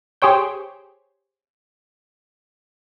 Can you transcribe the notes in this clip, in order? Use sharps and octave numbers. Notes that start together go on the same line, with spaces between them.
G4 G#4 C5 C#5 G5